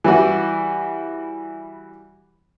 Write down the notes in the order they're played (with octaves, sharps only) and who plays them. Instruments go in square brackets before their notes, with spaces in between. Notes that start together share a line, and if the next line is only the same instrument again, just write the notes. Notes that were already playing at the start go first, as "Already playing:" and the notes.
[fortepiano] E3 G3 E4 F#4